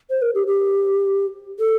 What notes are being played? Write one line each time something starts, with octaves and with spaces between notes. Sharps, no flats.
C5
A#4
G4
G4
A4